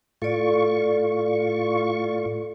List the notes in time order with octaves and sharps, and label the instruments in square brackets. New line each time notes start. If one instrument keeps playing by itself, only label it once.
[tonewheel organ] A2 F4 C#6 [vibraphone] A4 D5